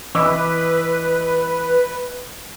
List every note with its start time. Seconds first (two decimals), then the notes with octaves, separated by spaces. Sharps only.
0.15 E3 B4 D#5 D6 E6